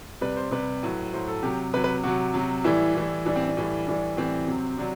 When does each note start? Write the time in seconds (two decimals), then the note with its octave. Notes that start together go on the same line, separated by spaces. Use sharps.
0.21 C3 G3 B4
0.36 C5
0.51 C3 G3 B4
0.83 A2 F#3
1.13 A2 F#3 C5
1.28 A4
1.43 C3 F#3 G4
1.73 C3 B4
1.76 F#3
1.84 B4
2.03 C3 F#3 F#4
2.34 C3 F#3
2.64 A2 E3 G3 E4
2.95 A2 E3 G3
3.25 A2 E3 G3 D4
3.36 C4
3.47 D4
3.57 A2 E3 G3
3.87 A2 E3 G3 D4
4.17 A2 E3 G3 C4
4.47 C3 F#3
4.78 C3 F#3 D4